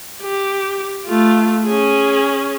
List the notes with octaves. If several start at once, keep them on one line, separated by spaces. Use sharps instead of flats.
G4
A3 F4
C#4 G#4